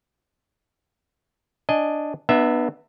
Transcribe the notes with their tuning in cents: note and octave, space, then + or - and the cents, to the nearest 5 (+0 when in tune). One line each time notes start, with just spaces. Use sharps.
D4 +0 D#5 +0 G#5 +0
B3 -10 D4 +40 E5 +0